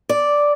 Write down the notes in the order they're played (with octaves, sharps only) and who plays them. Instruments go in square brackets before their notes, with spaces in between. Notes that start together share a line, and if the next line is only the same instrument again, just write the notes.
[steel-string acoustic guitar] D5